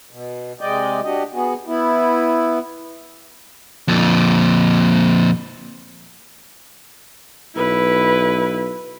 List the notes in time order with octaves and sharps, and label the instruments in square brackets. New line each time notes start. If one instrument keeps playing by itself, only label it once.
[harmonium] B2
C3 G#3 D5 D#5 G5
D4 F#4 G4 D#5
B3 F#4 G#4
B3 E4
[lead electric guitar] F2 A#2
[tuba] B1 [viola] E4 B4